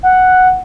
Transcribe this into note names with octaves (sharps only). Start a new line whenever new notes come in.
F#5